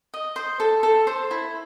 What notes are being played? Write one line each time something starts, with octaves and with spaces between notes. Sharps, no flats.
D#5
C5
A4
A4
C5
E4